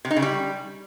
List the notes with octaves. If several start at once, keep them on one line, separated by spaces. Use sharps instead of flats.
C3
D#4
C#3
G3